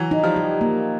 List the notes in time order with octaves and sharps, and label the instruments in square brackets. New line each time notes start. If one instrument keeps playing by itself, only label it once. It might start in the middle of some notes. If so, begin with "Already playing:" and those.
Already playing: [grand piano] E3 F#3
[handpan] D#4
[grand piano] F3 G3
[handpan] G4
A#3